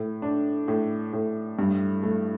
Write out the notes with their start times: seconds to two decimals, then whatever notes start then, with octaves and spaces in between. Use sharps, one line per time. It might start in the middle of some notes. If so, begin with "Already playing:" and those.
Already playing: A2
0.22 D4
0.68 A2
1.13 A2
1.59 G2
2.03 A3